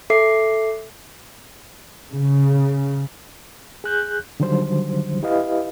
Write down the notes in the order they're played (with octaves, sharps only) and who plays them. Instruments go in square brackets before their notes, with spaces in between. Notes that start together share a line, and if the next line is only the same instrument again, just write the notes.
[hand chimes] A4 E5 D6 C7
[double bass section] C#3
[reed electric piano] G#4 F#6 G6
D3 D#3 F#3 G3 C5
E4 G4 B4 D#5 F5